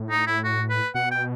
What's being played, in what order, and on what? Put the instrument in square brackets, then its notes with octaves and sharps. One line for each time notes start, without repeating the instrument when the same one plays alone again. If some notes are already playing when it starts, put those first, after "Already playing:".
Already playing: [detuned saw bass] A2
[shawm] D#4
E4
F#4
B4
[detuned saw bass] B2 [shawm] F#5
[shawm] G5